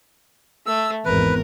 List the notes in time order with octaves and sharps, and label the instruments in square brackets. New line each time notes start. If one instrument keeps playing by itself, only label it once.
[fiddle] A3 [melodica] E6
[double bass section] G#1 E2 [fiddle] A#4 [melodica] B4